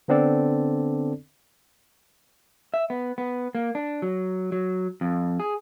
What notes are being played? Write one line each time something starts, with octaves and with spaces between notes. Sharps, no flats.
D3 B3 C4 D4 A4 D5
E5
B3
B3
A#3
D4
F#3
F#3
F2
G#4